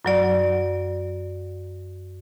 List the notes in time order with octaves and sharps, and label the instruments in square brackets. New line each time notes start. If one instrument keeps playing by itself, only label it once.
[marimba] F#2 F#3 D5